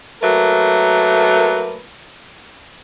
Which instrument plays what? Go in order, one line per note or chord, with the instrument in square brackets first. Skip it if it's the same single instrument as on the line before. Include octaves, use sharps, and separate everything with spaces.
[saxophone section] F#3 A3 A#3 A#4 B4